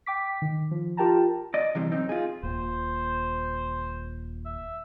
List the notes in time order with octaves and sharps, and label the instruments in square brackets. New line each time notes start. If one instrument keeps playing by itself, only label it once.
[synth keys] G5 D6 B6
D#3
F3
F4 G4 A#4 G5 A5 A#5
[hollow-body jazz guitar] D5 D#5
C3 E3 G3 C4
F#2 C4 D#4
F4 G#4
[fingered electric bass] D#1 A#2 [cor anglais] C5
[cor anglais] E5